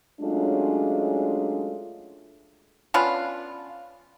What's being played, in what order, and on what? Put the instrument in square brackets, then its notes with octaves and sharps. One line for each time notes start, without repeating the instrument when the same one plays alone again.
[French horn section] F#3 G#3 A3 C#4 D4 F4
[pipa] B3 C#4 D4 F4